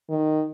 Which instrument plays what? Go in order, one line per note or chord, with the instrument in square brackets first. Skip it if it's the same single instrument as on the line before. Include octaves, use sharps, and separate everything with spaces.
[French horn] D#3